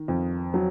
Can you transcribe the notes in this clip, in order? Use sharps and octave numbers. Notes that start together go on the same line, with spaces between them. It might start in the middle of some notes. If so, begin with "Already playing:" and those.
Already playing: D#3
F2
F#3